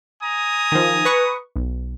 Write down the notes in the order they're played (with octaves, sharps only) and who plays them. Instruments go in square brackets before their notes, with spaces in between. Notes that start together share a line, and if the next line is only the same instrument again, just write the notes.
[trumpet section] G#5 A#5 D#6
[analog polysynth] D#3 F3
B4 C#6
B1